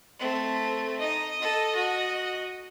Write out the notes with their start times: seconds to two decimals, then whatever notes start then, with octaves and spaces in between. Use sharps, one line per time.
0.20 A3 C4
1.00 D#4 D#5
1.41 A4
1.74 F#4